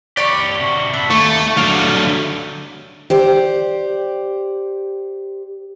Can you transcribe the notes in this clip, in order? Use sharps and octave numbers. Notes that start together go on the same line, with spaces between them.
G4 C#5 D5 B5 C#6
C3 F#4
D4 B4 E5
D#2 A3 C#6
D3 F#3 G3 A3 D5 F5
G4 C5 D5